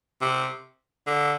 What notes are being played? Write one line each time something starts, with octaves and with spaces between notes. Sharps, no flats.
C3
D3